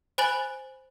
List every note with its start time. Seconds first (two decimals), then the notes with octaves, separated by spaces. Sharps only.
0.18 C5 G#5 B5 F#6 A6 F#7